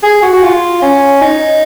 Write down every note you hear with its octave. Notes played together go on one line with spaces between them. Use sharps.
G#4
F#4
F#4
F4
C#4
D#4